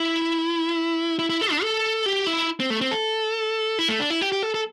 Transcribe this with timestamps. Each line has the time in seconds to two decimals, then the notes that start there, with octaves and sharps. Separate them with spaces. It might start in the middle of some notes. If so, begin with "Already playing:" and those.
Already playing: E4
1.19 E4
1.30 E4
1.41 A4
1.51 D4
1.63 A4
2.06 G4
2.27 E4
2.60 C4
2.70 A3
2.81 C4
2.91 A4
3.79 E4
3.89 A3
4.00 D4
4.10 E4
4.21 G4
4.32 G4
4.43 A4
4.54 A4